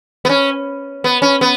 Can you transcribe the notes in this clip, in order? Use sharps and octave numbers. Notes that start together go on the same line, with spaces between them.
B3
C#4
B3
C#4
B3